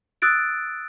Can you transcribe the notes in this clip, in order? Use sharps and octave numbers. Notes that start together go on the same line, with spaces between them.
D#6 E6 F#6 A6 D7